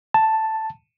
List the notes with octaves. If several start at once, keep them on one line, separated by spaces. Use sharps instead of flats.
A5